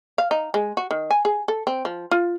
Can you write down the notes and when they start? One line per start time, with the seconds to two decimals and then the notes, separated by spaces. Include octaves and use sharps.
0.18 F5
0.31 D#4
0.54 G#3
0.77 F#4
0.91 D#3
1.11 G#5
1.25 G#4
1.48 A4
1.67 C4
1.85 F3
2.11 F4